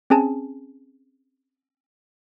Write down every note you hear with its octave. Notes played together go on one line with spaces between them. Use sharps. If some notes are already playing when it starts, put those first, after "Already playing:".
C4 C#4 G#4 G#5 A5